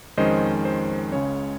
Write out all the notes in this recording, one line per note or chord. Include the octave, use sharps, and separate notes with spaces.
F2 D#3 G#3 C#4 C5 D#5
C5
C#2 C#3 G#3 C#4 C#5